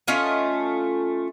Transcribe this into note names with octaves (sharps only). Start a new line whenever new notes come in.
A3 C#4 F4 D#5